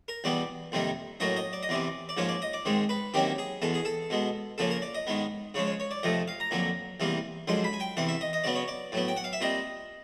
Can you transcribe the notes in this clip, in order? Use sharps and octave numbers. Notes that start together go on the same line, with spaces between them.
A#4
E2 B2 G3 B3 D5
F2 C3 D#3 G3 A#3
A2 F#3 A#3 C#4 D#5
D#5
D5
D#5
E2 C3 E3 D5
D5
G#2 F3 A#3 C#4 C#5
D5
D#5
D5
G#2 D#3 G#3 C4
B4
C3 D#3 F#3 A#3 C#4 G4
G#4
E2 B2 G#3 A4
G#4
A4
B2 G#3 B3
C#3 F3 A#3 C#4 A4
A#4
D5
D#5
G#2 D#3 G#3 B3
C#3 F3 G#3 C#4 C#5
C#5
C#5
D5
F2 C3 F3 A3 D#5
F5
A#5
F2 D3 F#3 A#3
E2 C3 E3 G3 A#3
F#2 D3 F3 G#3 C6
B5
G#5
G5
E2 C3 E3 F#5
E5
D#5
D#5
C#3 F#3 B3 D5
C#5
D5
A2 F#3 B3
G5
F#5
F5
E5
A#2 G3 C4 D#5